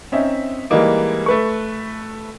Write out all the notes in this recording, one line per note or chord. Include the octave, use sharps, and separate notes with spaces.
C4 C#4 D#4 E5
E3 G3 G#3 A#3 D#4
A3 B4 C#6